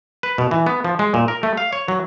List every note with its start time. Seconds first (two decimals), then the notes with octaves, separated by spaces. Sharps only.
0.23 B4
0.38 B2
0.51 E3
0.66 B3
0.84 F3
0.99 G#3
1.14 A#2
1.28 A#4
1.43 A3
1.57 F5
1.73 C#5
1.88 F#3